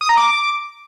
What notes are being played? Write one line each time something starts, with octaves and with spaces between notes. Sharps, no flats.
D#6
A#5
D6